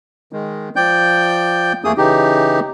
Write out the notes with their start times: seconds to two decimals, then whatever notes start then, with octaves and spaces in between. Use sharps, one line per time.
0.33 D#3 G#3
0.76 F3 D5 G5 G6
1.84 E2 A3 A#3 G#4 D#6
1.97 C#3 E3 D#4 G4